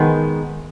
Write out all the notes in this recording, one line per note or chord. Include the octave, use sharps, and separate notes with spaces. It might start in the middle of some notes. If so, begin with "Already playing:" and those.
Already playing: D#3 G#3 B3